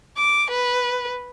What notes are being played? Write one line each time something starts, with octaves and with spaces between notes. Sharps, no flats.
D6
B4